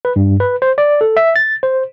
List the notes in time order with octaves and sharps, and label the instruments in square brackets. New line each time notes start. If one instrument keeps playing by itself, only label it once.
[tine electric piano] B4
G2
B4
C5
D5
A4
E5
A6
C5